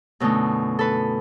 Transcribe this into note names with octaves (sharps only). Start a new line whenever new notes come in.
F#2 B2 D3 A3 D#4
A4 B4